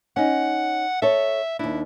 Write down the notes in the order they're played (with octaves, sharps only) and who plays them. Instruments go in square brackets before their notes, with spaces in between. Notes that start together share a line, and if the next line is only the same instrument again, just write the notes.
[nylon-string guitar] C#4 D#4 [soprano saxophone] F#5
[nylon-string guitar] A4 C#5 [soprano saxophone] E5
[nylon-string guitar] D#2 D4 [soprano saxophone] E4